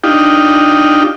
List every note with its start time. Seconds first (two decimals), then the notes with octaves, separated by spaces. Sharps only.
0.04 D4 D#4 F4 G4